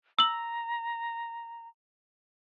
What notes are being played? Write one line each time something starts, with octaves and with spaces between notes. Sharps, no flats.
A#5 E6 F#7